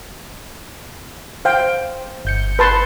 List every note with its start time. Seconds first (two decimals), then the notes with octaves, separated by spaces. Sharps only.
1.45 C5 F5 G5
2.25 G1 G6 C#7
2.59 B4 A5 C6